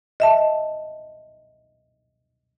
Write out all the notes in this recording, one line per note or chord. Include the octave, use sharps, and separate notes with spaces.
D#5 E5 A5